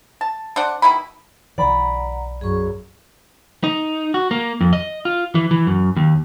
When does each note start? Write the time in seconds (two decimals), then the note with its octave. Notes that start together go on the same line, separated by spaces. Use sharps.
0.21 A5
0.56 D4 C5 D5 F#5
0.82 B2 D#3 E4 B5
1.58 B1 E3 D5 F#5 A#5 B5
2.41 F#2 G#4 C#6
3.64 D#4
4.14 F#4
4.31 A#3
4.61 F2
4.73 D#5
5.05 F4
5.35 E3
5.51 E3
5.66 F#2
5.96 D#2